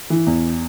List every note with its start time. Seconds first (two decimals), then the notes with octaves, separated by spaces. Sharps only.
0.10 E3
0.26 E2